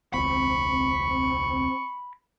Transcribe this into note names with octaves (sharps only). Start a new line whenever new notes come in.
E1 C#2 C4 B5 C#6